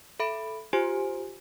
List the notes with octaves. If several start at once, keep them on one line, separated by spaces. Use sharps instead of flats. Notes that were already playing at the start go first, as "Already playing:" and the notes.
A4 E5 B5 D7
F4 G4 C5 G#5 D7